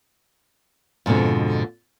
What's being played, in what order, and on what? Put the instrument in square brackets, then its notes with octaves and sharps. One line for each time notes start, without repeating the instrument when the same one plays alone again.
[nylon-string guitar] F2 G#2 B2 D3